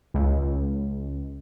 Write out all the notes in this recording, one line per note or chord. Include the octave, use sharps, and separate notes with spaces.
C#2